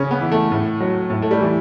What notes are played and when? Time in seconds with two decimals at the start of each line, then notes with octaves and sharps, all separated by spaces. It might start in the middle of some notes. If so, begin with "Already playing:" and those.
Already playing: C#3 C#4
0.11 B3
0.21 E3
0.31 A3
0.51 A2
0.80 F#3
1.10 A2
1.22 A3
1.31 G3
1.41 E3